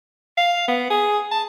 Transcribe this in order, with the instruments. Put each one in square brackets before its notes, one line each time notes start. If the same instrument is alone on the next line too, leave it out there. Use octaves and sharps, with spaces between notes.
[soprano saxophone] F5
B3
G#4
A5